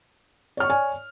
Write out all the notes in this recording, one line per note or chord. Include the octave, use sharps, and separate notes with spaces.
C#5 D5 G#5 C#6 F6